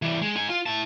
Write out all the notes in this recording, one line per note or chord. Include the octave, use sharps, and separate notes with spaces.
E3 G3
G#3
D#4 G#5
F4
E4 A5